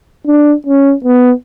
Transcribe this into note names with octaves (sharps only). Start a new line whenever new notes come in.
D4
C#4
B3